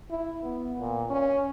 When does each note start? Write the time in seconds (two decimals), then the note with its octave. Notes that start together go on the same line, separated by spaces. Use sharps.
0.10 E4
0.43 B3
0.79 A#2
1.10 C#4